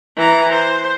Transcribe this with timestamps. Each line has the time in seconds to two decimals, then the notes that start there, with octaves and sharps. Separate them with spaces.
0.17 E3 A#5
0.52 C5